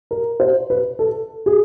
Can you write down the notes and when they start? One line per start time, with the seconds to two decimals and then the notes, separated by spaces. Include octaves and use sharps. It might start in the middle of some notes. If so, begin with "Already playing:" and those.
0.11 A#4
0.40 C5
0.70 B4
0.99 A4
1.46 G#4